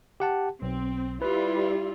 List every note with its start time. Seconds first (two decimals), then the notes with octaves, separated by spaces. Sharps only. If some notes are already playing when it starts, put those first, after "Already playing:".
0.20 G4 F#5 A5
0.62 B1 C4
1.22 G3 E4 F4 B4